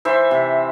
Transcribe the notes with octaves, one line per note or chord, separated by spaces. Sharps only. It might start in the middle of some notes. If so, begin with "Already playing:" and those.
E3 C5 E5
C3